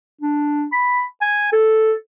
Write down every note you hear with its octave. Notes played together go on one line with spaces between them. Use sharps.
D4
B5
G#5
A4